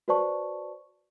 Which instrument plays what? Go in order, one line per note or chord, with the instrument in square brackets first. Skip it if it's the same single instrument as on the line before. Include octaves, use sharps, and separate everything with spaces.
[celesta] F#4 B4 C5 D5 A5 C#6